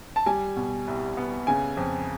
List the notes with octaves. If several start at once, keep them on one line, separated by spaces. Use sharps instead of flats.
A5
G3 G#5
B2
C2
B3
C#3 G#5
F2